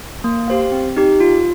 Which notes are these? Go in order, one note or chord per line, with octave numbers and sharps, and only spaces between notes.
A#3
G4 C5 F5
C4
D#4 G4
F4